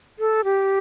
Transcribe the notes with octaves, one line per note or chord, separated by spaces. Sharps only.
A4
G4